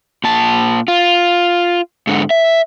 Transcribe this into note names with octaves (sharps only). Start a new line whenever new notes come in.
A#2 A5
F4
G#2 D3
E5